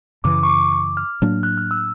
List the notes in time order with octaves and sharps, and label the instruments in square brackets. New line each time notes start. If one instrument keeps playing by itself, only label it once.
[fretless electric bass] F#2 C#3 E3 [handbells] D6
[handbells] C#6
D6
D6
F6
[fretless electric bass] A2 F#3 A#3 D4
[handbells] F#6
F6
E6